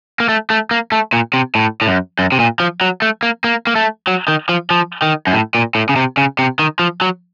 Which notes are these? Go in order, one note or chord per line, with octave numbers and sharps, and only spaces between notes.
A#3
A3
A3
A#3
A3
A#2
C3
A2
A2
F#2
F#2
C3
A#2
F3
F#3
A3
A#3
A#3
A#3
A3
F#3
D#3
F3
F3
D#3
F#2
A2
A#2
A2
C#3
C3
C#3
C3
D#3
F3
F#3